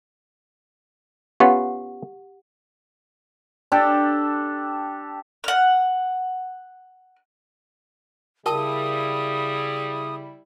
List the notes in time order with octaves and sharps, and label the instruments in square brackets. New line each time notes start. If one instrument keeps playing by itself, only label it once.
[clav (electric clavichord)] B3 C#4 F4 [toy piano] G4 F#5
[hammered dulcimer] D4 G4 A4
[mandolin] F#5 F6
[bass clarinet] C#3 [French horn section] G3 E4 [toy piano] A#4 G5 A5 [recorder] D#6